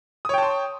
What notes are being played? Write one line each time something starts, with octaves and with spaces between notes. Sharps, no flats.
C#5 G5 A5 C6 D#6